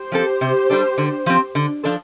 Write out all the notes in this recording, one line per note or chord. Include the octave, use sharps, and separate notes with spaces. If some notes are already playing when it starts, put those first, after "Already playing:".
Already playing: G4 C5
F3 C4 A4
C3
G3 D4 A4
D3
F3 C4
D3
F3 D4 A4